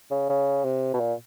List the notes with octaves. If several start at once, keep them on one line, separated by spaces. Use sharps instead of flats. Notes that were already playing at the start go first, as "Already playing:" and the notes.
C#3
C#3
C3
B2
A#2